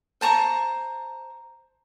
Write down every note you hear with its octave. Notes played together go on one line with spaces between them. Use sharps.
C5 A5 A#5 C#6